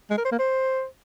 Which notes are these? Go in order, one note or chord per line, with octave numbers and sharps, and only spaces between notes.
G#3
A#4
C5
A#3
C5